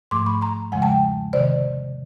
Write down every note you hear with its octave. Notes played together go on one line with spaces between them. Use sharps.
G#2 F3 A3 C6 D6
B5 C#6
A#5 C6
E2 C#3 F3 G#3 F#5 G#5
G5 A5
C3 D#3 C5 D5